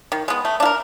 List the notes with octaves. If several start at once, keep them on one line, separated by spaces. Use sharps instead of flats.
D#3
G#3 B3
A3
D4 F4
A#4